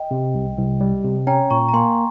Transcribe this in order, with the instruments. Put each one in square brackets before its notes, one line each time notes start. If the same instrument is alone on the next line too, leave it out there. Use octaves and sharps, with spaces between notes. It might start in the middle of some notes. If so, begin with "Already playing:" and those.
Already playing: [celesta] D#5 G5
[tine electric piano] C3
C2
C2
G3
C3
[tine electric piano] C#4 [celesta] G5 A#5
[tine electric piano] A#2 [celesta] A#5 C#6
[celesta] A#5
[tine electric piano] A#3 [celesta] G#5 C6